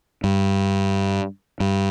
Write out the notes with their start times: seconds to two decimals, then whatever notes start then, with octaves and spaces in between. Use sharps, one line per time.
0.24 G2
1.60 G2